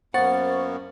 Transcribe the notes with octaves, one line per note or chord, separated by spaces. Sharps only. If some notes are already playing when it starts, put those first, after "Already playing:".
F#2 A#3 B3 C5 F#5 C#6 A6